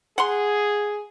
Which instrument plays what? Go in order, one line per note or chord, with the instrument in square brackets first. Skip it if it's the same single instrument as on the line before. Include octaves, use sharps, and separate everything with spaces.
[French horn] G#4 [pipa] F#5 A#5 C6